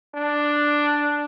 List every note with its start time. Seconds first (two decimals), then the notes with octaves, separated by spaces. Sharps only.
0.15 D4